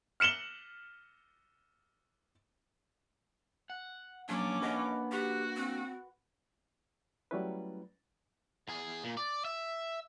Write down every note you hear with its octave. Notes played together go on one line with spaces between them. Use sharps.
F6 C#7 E7 F#7 G7
F#5
F#3 A#3 C#4 D4 D6
B4 D#5 F#5
F#4 G4
C4
F#3 G3 A3 C#4 E4 B4
E2 G#4
A#2
D5
E5